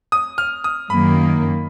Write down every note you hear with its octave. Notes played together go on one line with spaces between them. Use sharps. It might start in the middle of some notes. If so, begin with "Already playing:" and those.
D#6
F6
D#6
F#2 D#3 A#3 B5